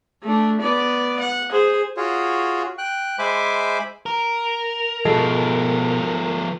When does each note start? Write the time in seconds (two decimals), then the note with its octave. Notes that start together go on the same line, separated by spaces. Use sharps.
0.23 A3 D4
0.61 B3 D5
1.20 F#5
1.51 G#4 C5
1.97 F4 F#4 G#4 C#5
2.78 G5 F#6
3.19 G#3 C5 E5 G#5 B5 D6
4.06 A#4
5.05 B2 F3 G#3 B3 A4